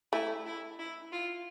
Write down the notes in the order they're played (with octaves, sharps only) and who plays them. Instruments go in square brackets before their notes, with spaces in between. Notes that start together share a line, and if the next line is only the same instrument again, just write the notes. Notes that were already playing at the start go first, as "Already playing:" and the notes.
[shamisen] A3 [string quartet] E4
[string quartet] E4
E4
F4